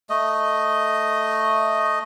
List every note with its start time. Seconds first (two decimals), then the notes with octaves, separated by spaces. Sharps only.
0.10 A3 D#5